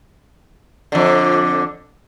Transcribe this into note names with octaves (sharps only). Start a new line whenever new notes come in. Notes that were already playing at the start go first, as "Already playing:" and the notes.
F2 D3